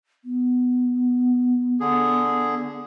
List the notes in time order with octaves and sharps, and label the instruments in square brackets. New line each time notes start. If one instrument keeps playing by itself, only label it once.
[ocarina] B3
[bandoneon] D3 G#4